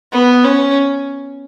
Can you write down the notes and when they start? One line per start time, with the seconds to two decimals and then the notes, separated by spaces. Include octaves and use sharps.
0.12 B3
0.44 C#4